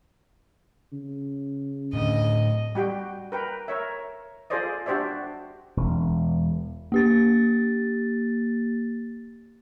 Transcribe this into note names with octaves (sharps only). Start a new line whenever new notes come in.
C#3
A2 D3 D#5
G3 F#4 G4 G5
A#4 B4 G5
A#4 C#5 E5
F4 G#4 A4 C5 D5 D#5
D4 F#4 G4 C5 D5 E5
E1
A#3 G4 A6